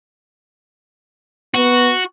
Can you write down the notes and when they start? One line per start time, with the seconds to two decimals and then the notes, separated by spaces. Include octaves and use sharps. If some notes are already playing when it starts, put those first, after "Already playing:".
1.55 B3 F#4